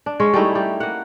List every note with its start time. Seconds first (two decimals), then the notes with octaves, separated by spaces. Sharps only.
0.06 D4
0.20 G#3 C#4 C#5
0.34 G3 A3 D#4 E4
0.55 G3 G4
0.80 A#3 F#5